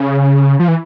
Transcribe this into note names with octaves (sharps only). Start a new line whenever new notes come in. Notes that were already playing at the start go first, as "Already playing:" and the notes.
Already playing: C#3
F3
E3